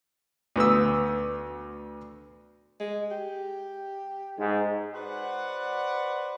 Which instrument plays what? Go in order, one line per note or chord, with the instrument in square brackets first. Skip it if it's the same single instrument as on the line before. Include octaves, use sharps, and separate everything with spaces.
[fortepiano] D2 B3 D#6 E6
[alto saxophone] G#3
G4
[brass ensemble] G#2
[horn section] F#4 B4 C5 D5 F#5